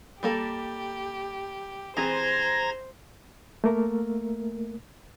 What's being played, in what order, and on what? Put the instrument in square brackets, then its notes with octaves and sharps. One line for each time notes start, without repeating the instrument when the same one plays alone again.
[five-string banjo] G3 A#3 A4 [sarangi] G4
[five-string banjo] E3 C4 G#4 [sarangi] C5 [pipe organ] A#5 G#6 A#6
[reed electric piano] A3 A#3 A#4